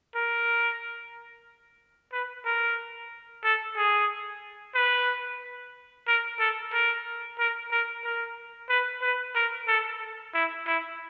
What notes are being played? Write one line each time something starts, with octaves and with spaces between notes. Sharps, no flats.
A#4
B4
A#4
A4
G#4
B4
A#4
A4
A#4
A#4
A#4
A#4
B4
B4
A#4
A4
E4
E4